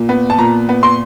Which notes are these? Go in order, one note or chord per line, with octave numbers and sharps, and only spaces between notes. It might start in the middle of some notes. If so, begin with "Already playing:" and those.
Already playing: A#2
B3
A5
A#2 A#5
B3
C6